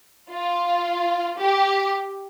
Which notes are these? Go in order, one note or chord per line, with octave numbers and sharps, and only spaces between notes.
F4
G4